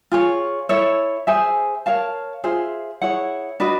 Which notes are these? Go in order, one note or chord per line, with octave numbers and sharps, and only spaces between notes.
F4 G#4 C#5
E4 A4 C#5 E5
G#4 C5 E5 G#5
A#4 C#5 F5 A5
F4 G#4 C5 E5
E4 G#4 C#5 F#5
D4 F#4 B4 D#5